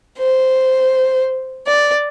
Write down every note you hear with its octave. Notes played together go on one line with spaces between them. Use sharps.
C5
D5